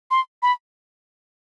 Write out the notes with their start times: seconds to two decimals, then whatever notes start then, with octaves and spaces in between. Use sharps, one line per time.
0.11 C6
0.43 B5